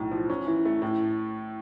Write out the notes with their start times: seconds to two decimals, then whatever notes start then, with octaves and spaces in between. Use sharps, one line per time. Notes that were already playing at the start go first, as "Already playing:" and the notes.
Already playing: B1 A2
0.11 F3
0.30 C#4
0.47 E3
0.65 A3
0.82 A2